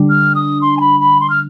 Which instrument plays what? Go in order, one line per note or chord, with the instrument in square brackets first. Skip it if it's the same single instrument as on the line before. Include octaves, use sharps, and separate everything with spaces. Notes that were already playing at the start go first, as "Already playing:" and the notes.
Already playing: [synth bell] D3 G3 D4
[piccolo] F6
D#6
C6
G#5
B5
B5
C6
F6